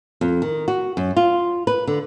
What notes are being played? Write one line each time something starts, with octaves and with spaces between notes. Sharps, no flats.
F2
D#3
F#4
F#2
F4
B4
D3